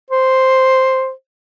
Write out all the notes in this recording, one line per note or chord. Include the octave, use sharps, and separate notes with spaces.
C5